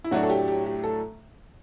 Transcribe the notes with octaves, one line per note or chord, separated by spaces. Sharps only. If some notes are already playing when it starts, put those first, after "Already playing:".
E4
A2 F#3 A3 D4 F#4
A4
G4
G4
G4
A4